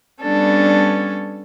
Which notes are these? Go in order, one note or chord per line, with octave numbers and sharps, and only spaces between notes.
G3 B3 C#4 D4 A4